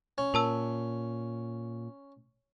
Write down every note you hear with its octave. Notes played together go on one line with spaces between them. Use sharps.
C#4
A#2 A#4 A5 E6